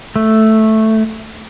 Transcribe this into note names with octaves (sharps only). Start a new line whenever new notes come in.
A3